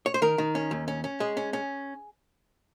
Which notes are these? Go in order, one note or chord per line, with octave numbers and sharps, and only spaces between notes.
C#5
C5
D#3 A#4
D#3
C#4
D#2
C#4
C#4
G#3 G#4
C#4
C#4